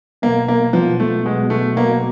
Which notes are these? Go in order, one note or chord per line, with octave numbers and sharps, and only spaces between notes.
B2 F#3 A#3 B3
A#3
B2 F3 F#3 B3
A3
B2 F#3 G#3 B3
A3
B2 F#3 A#3 B3